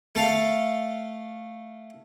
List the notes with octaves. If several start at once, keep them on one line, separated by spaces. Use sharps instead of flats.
A3 A4 F5